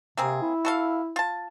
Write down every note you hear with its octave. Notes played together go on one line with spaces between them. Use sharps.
C3 A#3 C4 G#4
E4
F#4 A4 F5
F4 A5